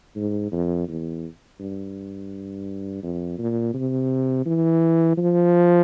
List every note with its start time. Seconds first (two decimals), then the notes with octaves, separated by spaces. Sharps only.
0.16 G#2
0.52 F2
0.89 E2
1.60 G2
3.03 F2
3.39 A#2
3.74 C3
4.46 E3
5.17 F3